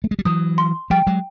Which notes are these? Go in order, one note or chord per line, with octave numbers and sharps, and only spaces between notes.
A3
G#3
G3
E3 F#3 D#6
C6
F3 G3 G5
F#3 G#3